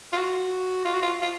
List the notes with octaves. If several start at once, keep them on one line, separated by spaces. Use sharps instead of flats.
F4
F#4
F4
F#4
F4
F4